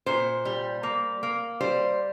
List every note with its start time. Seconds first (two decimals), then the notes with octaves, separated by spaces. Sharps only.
0.06 A#2 C5
0.45 G3
0.83 A#3
1.23 A#3
1.61 G3 C5